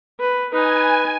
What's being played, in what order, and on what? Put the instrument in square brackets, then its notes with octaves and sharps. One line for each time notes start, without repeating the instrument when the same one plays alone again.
[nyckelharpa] B4
[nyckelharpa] D#4 [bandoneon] B4 [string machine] G#5